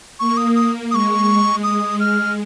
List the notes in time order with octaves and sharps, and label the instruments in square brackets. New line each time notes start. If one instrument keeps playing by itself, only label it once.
[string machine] A#3 [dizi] C#6
[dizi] D#6
D#6
[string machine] G#3 [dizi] C#6 D#6
[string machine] G#3 [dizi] D#6
[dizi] F6